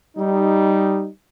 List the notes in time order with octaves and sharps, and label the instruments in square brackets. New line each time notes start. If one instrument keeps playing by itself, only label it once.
[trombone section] G3 D#4